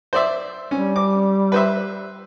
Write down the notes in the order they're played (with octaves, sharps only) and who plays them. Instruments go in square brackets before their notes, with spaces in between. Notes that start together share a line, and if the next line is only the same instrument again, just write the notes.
[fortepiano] C5 D5 E5
[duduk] G3 [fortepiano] C#4
[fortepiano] D6
B4 C5 E5